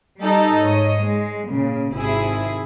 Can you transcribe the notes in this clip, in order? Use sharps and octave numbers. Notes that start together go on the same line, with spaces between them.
G3 D#4 G4 A4
G#2 C#5 D#5
G#3
A#2 C#3
G#1 C3 E4 G#4